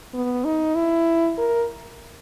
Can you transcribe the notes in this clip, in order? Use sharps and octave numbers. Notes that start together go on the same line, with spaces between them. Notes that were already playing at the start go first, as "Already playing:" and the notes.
B3
D#4
E4
A#4